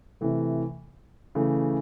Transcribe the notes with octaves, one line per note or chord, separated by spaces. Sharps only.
C3 E3 A3
C#3 E3 A3